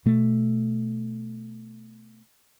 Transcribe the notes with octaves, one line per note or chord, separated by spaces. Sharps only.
B2 A3